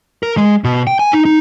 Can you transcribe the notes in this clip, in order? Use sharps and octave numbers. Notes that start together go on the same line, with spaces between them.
A#4
G#3
B2
G5
G#5
D#4
D#4